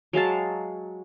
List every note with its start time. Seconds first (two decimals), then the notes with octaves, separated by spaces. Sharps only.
0.13 F#3 G#3 F5 A5